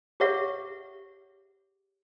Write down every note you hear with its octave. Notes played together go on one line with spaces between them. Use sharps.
G4 G#4 C#5 E5 F#5